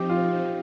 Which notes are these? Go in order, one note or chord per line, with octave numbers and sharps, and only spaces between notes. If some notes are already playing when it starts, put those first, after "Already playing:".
Already playing: F3 C4 D#4 G4
F4